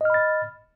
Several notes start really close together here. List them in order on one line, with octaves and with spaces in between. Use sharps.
D#5 F6 B5 A6